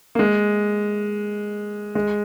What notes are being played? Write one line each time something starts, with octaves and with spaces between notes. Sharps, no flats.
A#3
G#3
G#3